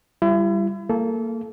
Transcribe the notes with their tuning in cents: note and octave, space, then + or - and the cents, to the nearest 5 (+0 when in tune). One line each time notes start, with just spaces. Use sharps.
G3 +0 E4 +40
A#3 -25 A4 -25